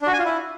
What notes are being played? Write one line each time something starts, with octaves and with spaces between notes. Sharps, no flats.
D4
F#4
G#5
F4
E4